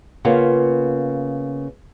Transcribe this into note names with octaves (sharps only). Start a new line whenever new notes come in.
C#3 A#3 B3 F4